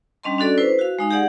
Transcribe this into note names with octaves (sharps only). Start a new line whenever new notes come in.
G3 C#4 D4 D#5 A5 C6
C#4 D4 F#4 A4 D5
E4 B4 C5
F#4 F5
G#3 D#4 F5
G4 G#4 D5 F#5